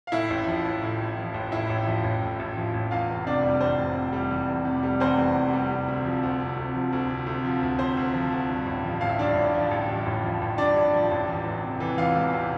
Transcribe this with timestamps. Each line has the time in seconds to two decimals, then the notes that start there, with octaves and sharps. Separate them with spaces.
0.07 F5
0.12 A2 E4 E5
0.30 A1
0.47 F3
0.65 A1
0.82 A2
1.00 A1
1.17 F3
1.34 A1
1.52 A2 E4 E5
1.69 A1
1.87 F3
2.04 A1
2.22 A2
2.39 A1
2.57 F3
2.74 A1
2.91 E2 F4 F5
3.09 F1
3.26 C3 D4 D5
3.43 G3
3.60 E2 C4 C5
3.78 F1
3.97 C3
4.13 G3
4.31 E2
4.48 F1
4.65 C3
4.83 G3
5.00 E2 C4 C5
5.17 F1
5.36 C3
5.53 G3
5.70 C3
5.88 D2
6.04 F3
6.23 D2
6.40 C3
6.57 D2
6.74 F3
6.93 D2
7.10 C3
7.26 D2
7.45 F3
7.62 D2
7.79 C3 C4 C5
7.97 D2
8.14 F3
8.32 D2
8.49 G2
8.66 A1
8.84 F3
9.01 A1 F5
9.09 E5
9.19 G2 D4 D5
9.36 A1
9.54 F3
9.71 A1
9.89 G2
10.06 A1
10.23 F3
10.41 A1
10.58 G2 D4 D5
10.76 A1
10.94 F3
11.11 A1
11.27 E2
11.45 E1
11.63 C3
11.80 E3
11.97 E2 F4 F5
12.16 E1
12.33 C3